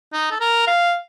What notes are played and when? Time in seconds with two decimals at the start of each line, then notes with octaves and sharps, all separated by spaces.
0.13 D#4
0.31 A4
0.40 A#4
0.67 F5